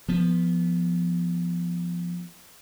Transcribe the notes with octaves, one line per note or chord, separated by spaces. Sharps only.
F3 B3